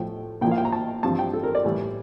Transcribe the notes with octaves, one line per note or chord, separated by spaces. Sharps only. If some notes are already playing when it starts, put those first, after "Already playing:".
Already playing: A2 F3 A3 G5
A#2 F3 A#3 E4 G5
F5
G5
A#5
A5
G2 F3 C4 F4 A5
G5
A4
A#4
D5
A2 E3 G3